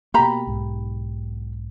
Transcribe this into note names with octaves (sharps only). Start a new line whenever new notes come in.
B2 A#3 G4 A#5 B5
B1 G#2